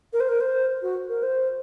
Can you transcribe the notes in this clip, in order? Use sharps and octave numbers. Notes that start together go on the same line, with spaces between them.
A#4
C5
A#4
C5
F#4
A#4
C5